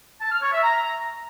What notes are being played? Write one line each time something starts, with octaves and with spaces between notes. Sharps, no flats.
A5
F6
C#5
E5
A#5